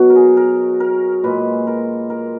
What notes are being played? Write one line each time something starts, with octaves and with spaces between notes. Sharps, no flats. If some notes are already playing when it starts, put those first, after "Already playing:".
Already playing: B2 F#3 F#4
A#4
G#4
A#4
A#4
A#2 G#3 B4
A#4
A#4